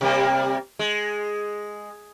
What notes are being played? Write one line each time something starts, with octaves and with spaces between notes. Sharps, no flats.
C3 G3 A#3
G#3